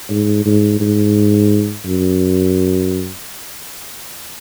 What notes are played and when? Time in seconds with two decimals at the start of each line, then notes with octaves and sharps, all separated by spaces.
0.10 G#2
0.45 G#2
0.80 G#2
1.85 F#2